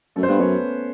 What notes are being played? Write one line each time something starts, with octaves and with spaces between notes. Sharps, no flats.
F#2 A3 A4
C5
G2 B3 B4
F#2 C#4 C#5